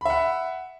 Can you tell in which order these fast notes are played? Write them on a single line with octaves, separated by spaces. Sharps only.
B5 E5 F#5